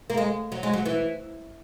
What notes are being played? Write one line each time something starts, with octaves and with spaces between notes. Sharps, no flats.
A#3
G#3
F#3
G#3
F#3
E3